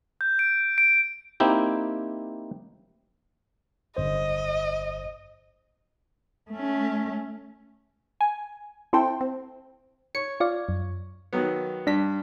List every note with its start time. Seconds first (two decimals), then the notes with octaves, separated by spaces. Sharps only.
0.21 G6
0.39 D7
0.78 D7
1.40 A#3 C4 D#4 E4 G4
3.97 G1 C5 D#5
6.51 A3 C#4
8.21 G#5
8.93 C4 E4 A4 C5 G5
9.21 C4
10.15 C#5 C#7
10.40 F4 D5 F5
10.69 F#2
11.33 D#3 F#3 B3
11.87 G2 D4 B6